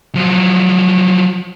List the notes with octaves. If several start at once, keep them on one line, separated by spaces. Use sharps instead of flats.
F3 F#3